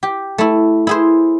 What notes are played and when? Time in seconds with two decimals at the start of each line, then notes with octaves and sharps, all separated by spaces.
0.03 G4
0.38 A3 E4
0.87 E4 G#4 C5